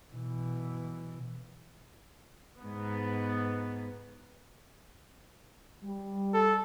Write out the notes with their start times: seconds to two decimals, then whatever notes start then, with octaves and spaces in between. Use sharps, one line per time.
0.13 B2 E3
2.61 G#2 B3
5.84 G3
6.34 A4